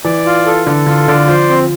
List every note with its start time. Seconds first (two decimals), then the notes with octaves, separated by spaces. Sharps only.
0.05 E3 D5
0.26 F4
0.46 A4
0.67 D3 A4
0.87 D3 F4
1.08 D3 D5
1.28 F3 C5
1.49 C4